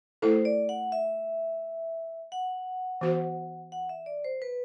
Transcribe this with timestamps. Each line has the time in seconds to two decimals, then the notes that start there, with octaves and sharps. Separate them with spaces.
0.22 A3 E4 A4 C5
0.45 D5
0.69 F#5
0.92 E5
2.32 F#5
3.01 E3 B3 F#4 C5
3.72 F#5
3.89 E5
4.06 D5
4.24 C5
4.42 B4